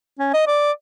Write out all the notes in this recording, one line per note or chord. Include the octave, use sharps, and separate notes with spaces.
C#4
D#5
D5